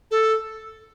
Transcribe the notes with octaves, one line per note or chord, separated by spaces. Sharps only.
A4